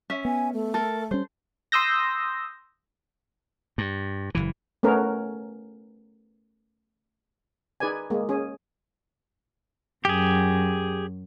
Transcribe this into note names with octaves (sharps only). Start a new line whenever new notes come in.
C#4 E5
B3 G#5
A3
A4 A#4
G3 C#4 C5
C6 D#6 E6 G6 A#6
G2
F#1 C#2 E3
A3 B3 C#4 A#4
D#4 G#4 B4 D5 G#5
G#3 A#3
C#4 G#4
F#2 G4 G#4